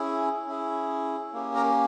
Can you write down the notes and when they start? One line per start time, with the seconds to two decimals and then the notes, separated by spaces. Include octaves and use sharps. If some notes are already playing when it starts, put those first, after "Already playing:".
Already playing: C#4 E4 G#4
0.46 C#4 E4 G#4
1.33 A#3 C#4 G4
1.55 A#4 A#5